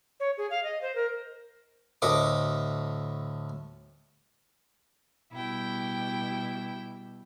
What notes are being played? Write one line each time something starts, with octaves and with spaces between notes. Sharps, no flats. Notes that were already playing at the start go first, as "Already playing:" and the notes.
C#5
G#4
F5
D#5
C5
A#4
D2 A2 D#5 E5 C#6 D6
B2 G3 E4 G5